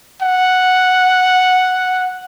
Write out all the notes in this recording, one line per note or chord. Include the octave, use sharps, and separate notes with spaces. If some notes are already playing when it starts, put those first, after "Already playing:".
F#5